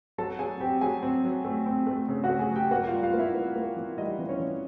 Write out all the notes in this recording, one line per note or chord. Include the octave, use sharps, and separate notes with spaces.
F#3 A4 A5
F#3 G#4 G#5
C4 G4 G5
F#3 G#4 G#5
C4
F#3
A3
C4
A3
C#3
F#4 F#5
A3
G#4 G#5
F#3
G4 G5
A#3 F#4 F#5
F4 F5
G3
F4 F5
A#3
E4 E5
A#3
A#3
E3
G3 D#4 D#5
E3
C#4 C#5
E3